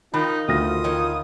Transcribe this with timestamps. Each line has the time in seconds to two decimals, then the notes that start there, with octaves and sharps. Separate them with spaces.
0.14 D#3 D#4 F4 B5
0.48 D2 F4 D#6 F6 A#6
0.84 D#3 D#4 C#5